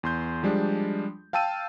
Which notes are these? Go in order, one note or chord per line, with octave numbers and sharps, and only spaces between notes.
E2 C6 G6
F3 G3 G#3 D4
F5 G5 A5 E6 D#7